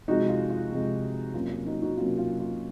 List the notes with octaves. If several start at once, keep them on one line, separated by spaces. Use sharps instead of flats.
C3 F3 G#3 D#4 F#4
F4
F4
C3 F3 G#3
C3 F#3 A#3 C#4 F4
F4
D#4 F#4
D#4 F#4
C3 F#3 A#3 C#4 F4
F4
F4